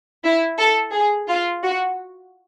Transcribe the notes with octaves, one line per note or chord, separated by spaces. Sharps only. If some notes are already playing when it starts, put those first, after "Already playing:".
E4
A4
G#4
F4
F#4